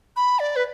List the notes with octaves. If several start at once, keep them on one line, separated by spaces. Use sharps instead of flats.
B5
D5
B4